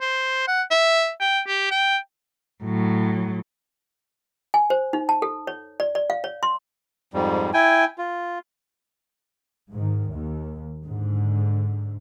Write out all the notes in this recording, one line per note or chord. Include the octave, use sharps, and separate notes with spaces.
C5
F#5
E5
G5
G4
G5
A2 F#3
G#5
C5
D#4
A5
A4
C#5
D5
D5
F5
C#5
C6
F2 G#2 G3
E4 G5 G#5
F4
G#2 D#3
D#2
G#2 D3